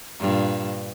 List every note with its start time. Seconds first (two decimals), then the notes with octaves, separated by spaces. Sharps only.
0.20 G2 A#2